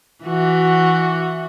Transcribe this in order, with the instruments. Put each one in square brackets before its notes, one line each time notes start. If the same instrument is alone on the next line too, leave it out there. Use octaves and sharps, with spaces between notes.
[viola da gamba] E3 F#4